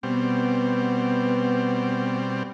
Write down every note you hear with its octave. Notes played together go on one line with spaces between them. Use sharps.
B2 G3 B3 C4